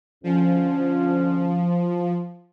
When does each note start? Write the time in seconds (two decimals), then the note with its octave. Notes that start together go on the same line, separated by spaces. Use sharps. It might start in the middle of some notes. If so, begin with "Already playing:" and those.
0.24 F2 D3 F3 C#4